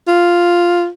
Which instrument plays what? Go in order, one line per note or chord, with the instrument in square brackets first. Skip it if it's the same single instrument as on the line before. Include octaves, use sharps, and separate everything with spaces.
[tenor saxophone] F4